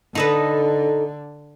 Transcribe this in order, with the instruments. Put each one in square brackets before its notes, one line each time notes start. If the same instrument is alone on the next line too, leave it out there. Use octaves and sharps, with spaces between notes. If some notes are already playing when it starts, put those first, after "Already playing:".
[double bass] D3 [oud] D#4 A4 B4